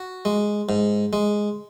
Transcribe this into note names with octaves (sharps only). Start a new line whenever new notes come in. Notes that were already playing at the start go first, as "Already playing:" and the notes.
Already playing: F#4
G#3
G#2
G#3